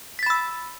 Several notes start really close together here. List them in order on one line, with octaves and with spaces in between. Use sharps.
B6 A6 B5 E6